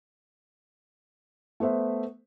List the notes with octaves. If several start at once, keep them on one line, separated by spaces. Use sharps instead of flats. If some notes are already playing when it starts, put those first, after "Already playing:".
A3 B3 C5 E5